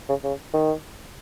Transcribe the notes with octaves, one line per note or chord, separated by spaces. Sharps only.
C#3
C#3
D#3